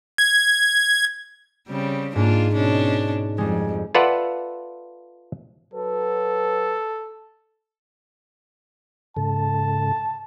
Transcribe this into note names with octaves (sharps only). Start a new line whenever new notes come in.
G#6
C#3 G3 C4
G#2 A#3 D4 F4
B2 C#4 D4
F2 G3 G#3
F4 A4 B4 D5 E5 F#5
F#3 A4 B4
G#2 C#3 A4 A5